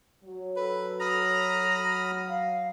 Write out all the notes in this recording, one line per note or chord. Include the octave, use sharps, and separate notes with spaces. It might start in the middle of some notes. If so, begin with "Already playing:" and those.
F#3
A4 B4
A#5 B5 D#6 F6
F5